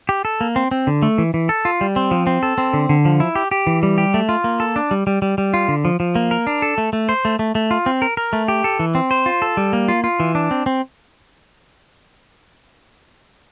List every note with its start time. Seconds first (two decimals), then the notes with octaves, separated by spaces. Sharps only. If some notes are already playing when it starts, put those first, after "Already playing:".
0.09 G4
0.25 A4
0.41 A#3
0.56 C4
0.71 C4
0.87 D3
1.02 A3
1.18 E3
1.34 E3
1.49 A4
1.65 F4
1.81 G3
1.96 C4
2.11 F3
2.27 C4
2.43 A4
2.58 C4
2.73 D3
2.89 D3
3.05 F3
3.20 E4
3.35 G4
3.51 G4
3.67 E3
3.83 G3
3.98 G4
4.14 A3
4.29 F4
4.44 A#3
4.60 A4
4.76 D4
4.91 G3
5.07 G3
5.22 G3
5.38 G3
5.54 F4
5.68 D3
5.85 F3
6.00 F3
6.15 A#3
6.31 A#4
6.47 D4
6.62 A4
6.78 A3
6.93 A3
7.09 C5
7.25 A3
7.39 A3
7.55 A3
7.71 F4
7.86 C4
8.02 A#4
8.17 A#4
8.33 A3
8.48 G4
8.64 A4
8.79 E3
8.95 C4
9.11 C5
9.26 F4
9.42 A4
9.57 G3
9.73 A#3
9.88 F4
10.04 F4
10.20 E3
10.35 D4
10.51 C4
10.66 C4